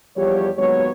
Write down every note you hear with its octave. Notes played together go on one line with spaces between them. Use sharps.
E2 F3 G3 G4 C#5
D#2 F#3 G#3 B3 C#5